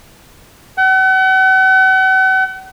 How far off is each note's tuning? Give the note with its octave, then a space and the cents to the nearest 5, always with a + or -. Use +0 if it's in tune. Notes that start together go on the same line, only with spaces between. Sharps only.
F#5 +40